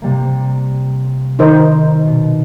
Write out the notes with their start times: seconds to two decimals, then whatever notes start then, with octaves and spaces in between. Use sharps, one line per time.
0.02 C3 G3 A#3
1.39 D#3 D#4 A#4 C5 F6 G6
2.06 B2